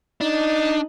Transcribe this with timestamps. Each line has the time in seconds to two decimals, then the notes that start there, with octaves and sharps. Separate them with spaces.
0.21 D4 D#4